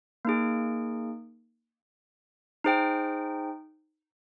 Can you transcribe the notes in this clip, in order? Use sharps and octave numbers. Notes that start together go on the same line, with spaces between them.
A#3 D#4 G#4
D#4 G#4 C5 G5